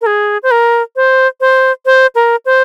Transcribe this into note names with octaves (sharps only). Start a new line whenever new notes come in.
A#4
G#4
C5
A#4
C5
C5
C5
A#4
C5